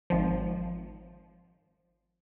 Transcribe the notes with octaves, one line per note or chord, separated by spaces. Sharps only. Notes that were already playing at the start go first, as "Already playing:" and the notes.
G#1 F3